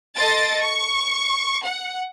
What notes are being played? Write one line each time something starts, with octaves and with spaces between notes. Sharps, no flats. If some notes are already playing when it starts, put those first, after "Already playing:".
A4 D#5 C6 A6 D7
C#6
F#5